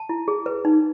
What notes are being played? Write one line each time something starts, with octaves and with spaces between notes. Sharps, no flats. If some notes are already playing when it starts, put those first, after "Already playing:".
Already playing: A5
E4
G#4
B4
D#4